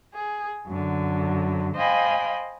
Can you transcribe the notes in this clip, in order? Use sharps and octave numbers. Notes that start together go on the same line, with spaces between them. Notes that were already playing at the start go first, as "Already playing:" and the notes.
G#4
F#2 D3
C5 D#5 F5 G5 G#5 B5